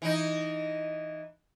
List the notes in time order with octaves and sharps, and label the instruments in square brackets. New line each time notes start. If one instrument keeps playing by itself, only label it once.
[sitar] E3 D#4